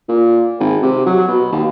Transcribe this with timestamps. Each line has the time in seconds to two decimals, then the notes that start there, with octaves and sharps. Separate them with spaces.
0.09 A#2
0.60 G#1
0.83 C3
1.06 F#3
1.28 B2
1.52 D#2